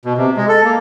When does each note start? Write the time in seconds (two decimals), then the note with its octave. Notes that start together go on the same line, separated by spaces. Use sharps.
0.05 B2
0.17 C3
0.37 G#3
0.48 A4
0.64 A#3